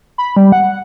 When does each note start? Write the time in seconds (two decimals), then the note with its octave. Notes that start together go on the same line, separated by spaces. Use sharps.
0.18 B5
0.37 G3
0.52 F#5